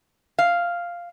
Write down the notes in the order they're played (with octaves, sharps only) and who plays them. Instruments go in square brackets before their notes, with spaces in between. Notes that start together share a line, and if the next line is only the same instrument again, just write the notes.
[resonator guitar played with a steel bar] F5